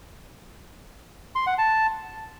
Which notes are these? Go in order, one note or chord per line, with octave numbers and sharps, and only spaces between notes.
C6
F#5
A5